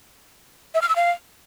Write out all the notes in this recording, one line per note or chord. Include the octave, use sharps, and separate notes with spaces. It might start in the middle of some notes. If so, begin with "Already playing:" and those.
E5
F6
E6
F5